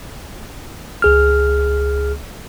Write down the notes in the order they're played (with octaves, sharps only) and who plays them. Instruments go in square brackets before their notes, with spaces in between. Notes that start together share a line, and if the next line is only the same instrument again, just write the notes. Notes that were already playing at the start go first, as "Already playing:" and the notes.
[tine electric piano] C#2 G#4 F6